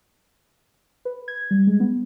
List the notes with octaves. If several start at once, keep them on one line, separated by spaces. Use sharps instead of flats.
B4
G#6
G3
G#3
B3